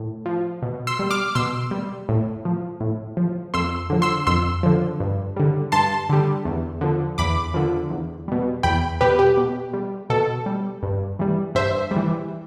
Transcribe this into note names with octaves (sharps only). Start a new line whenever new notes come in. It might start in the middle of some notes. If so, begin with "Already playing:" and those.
Already playing: A2
F3
B2
C6 E6
G3
D6 F6
B2 C6 E6
G3
A2
F3
A2
F3
F2 C6 E6
D3 F3
C6 E6
F2 C6 E6
D3 F3
G2
D3 G3
G2 A5 C6
D3 G3
E2
D3 F3
E2 B5 D6
D3 F3
E2
B2 G3
E2 G5 B5
B2 G3 G4 B4
G4
B2
G3
B2 A4
G3
G2
E3 G3
G2 C5 E5
G3
E3